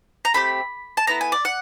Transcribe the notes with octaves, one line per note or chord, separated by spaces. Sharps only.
A#5
A3 C4 G4 B5
A5
B3 E4 A4 A#5
G#5
D5
F#5